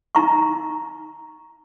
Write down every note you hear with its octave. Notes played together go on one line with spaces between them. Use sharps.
D#4 A#5 C#6